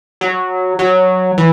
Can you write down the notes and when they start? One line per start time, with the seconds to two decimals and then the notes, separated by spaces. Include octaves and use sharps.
0.21 F#3
0.79 F#3
1.38 E3